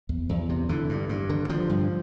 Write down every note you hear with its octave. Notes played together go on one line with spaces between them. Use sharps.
E2
E2
C3
D3 E3
G2
G2
D3
D3 F3
G2